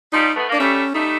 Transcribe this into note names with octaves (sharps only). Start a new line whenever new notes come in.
F3 G3 D#4
A3 B3
A#3 D4
G3 A3 C#4
G3 A3 D#4